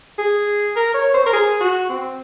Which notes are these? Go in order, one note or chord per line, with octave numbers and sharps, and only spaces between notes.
G#4
A#4
C#5
C5
A#4
G#4
F#4
C4